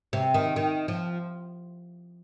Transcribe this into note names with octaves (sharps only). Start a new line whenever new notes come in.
C3
D#3
D#3
F3